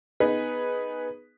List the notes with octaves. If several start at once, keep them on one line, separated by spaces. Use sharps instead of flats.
B3 D#4 G#4 B4